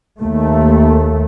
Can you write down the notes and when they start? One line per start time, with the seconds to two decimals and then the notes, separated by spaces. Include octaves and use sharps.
0.20 D#2 A3